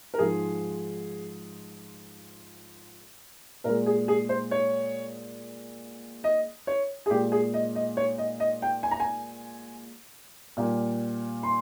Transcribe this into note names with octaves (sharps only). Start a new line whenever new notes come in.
A#4
G#2 F3 G#3 G#4
A#2 G#3 A#4
G#4
G#4
C5
C#5
D#5
C#5
G#4
A#2 G#3 G4
G#4
D#5
D#5
C#5
D#5
D#5
G5
G#5
A#5
G#5
A#2 G3 A#3
C6